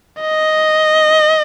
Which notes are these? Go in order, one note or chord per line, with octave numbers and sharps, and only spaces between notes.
D#5